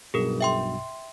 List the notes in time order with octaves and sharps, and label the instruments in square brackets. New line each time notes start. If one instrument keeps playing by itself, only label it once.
[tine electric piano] B1 G2 B2 [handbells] G#4 A#4
[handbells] E5 G5 C6